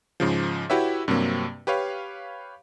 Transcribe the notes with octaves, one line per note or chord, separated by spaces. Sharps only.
G#2 C#3 F3
E4 F#4 G4 B4 C#5 E5
G2 C3 F#3 A#3 C4
G4 B4 C#5 F5